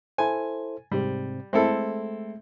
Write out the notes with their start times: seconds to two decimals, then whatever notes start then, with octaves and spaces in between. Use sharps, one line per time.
0.18 E4 A4 C5 G#5
0.92 G#2 C3 G3 C4
1.53 G#3 A3 C4 E4 A4